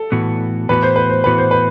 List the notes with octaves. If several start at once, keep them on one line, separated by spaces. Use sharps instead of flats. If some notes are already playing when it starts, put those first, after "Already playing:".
Already playing: A4
A2 E3 B3 F#4
A2 E3 B3 F#4 B4
C5
B4
C5
A2 E3 B3 F#4 B4
C5
B4